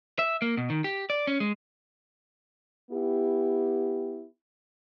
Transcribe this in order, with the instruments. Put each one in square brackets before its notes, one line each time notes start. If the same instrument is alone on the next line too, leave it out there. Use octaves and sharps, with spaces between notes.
[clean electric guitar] E5
A#3
B2
D#3
G4
D5
C#4
G#3
[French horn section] B3 E4 G4